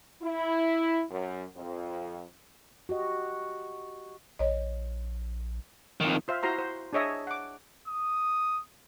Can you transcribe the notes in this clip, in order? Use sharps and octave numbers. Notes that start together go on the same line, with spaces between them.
E4
F#2
F2
F#4 G4 D#5
A#1 C#5 D#5
F2 D#3
F4 C5 E5 F5
E4 F#4 C5 A#5 C6
C5
D4 G#4 C#5 D#5 E5
F#5 D6
D#6